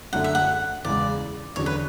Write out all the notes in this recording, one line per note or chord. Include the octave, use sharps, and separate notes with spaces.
F#2 D3 A3 F#5
E5
F#5
E2 C#3 G#3 D5
E2 D3 F#3 C#4 C#5
B4